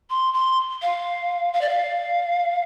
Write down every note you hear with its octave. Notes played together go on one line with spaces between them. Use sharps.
C6
C6
F5
F5
D5
F5